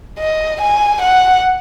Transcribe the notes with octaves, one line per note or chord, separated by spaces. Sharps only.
D#5
G#5
F#5